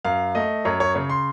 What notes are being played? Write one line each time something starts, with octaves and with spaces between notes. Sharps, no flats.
F#2 F5
A3 D#5
F#2 C#5
C#5
C#3 C#5
C6